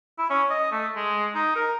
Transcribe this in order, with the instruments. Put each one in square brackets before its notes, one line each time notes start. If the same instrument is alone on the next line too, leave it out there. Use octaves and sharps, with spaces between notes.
[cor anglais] E4
C#4
D#5
A3
G#3
D#4
A#4